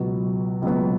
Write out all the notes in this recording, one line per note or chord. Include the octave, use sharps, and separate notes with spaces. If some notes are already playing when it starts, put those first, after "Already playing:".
Already playing: C#2 B2 F#3 B3
C#2 B2 F#3 B3